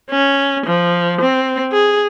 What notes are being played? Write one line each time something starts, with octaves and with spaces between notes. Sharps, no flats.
C#4
F3
C4
G#4